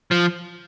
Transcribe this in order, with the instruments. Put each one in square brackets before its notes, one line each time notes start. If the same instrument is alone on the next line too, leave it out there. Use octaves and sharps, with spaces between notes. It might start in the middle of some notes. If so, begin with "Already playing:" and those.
[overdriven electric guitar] F3